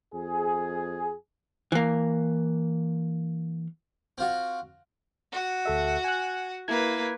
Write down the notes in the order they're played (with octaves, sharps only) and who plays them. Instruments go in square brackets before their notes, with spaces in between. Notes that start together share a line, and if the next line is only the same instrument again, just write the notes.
[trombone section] F2 G#4
[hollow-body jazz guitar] E3 A#3
[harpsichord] C4 F4 F#4
[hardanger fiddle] F#4 F#5
[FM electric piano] D2 A4 E5
G#5 F#6
[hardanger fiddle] A#3 B4 [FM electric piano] E4 G#6